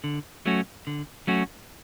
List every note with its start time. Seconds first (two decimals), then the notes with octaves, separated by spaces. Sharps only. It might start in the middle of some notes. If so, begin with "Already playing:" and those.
0.04 D3
0.46 F#3 A3 C#4 F#4
0.87 D3
1.27 F#3 A3 C#4 F#4